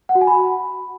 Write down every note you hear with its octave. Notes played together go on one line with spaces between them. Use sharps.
F#5
F#4
G#5
B5